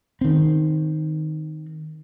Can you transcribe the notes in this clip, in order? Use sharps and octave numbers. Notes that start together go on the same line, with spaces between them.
D#3 C4